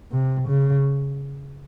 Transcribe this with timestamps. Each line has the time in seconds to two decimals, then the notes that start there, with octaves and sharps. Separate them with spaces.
0.11 C3
0.49 C#3